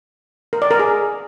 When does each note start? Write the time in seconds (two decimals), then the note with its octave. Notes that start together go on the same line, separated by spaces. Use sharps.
0.53 A#4
0.62 D5
0.71 A#4
0.80 G#4